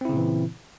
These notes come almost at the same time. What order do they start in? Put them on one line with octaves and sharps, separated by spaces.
C4 E4 C#3 A#2 E3